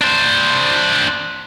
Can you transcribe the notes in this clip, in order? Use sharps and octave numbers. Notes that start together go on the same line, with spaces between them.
D4 C5